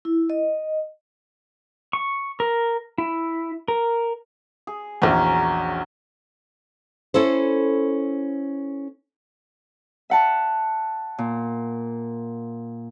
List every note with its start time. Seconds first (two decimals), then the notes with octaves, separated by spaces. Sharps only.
0.05 E4
0.30 D#5
1.93 C#6
2.40 A#4
2.98 E4
3.68 A#4
4.67 G#4
5.02 A#1 E2 F#3 C#4
7.14 C#4 E4 A4 C5
10.10 E5 F#5 A5
11.18 A#2